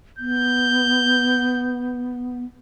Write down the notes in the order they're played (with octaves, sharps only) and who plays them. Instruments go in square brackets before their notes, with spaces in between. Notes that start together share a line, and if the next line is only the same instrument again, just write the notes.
[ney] B3 [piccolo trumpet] G6